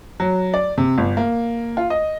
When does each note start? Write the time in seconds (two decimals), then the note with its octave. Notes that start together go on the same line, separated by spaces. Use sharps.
0.20 F#3
0.54 D5
0.78 C3
0.98 G1
1.17 A#3
1.77 F4
1.90 D#5